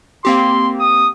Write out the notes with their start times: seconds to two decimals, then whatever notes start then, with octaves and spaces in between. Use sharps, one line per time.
0.25 A#3 C4 G4 C6
0.80 D#6